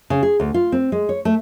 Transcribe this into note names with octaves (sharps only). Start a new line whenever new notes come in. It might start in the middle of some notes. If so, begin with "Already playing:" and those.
C#3
G#4
D2
F4
C4
G#3
C#5
A3